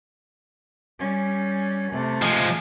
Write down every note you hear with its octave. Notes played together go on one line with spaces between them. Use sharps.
G3 C#4
C3 A3
F3 G#3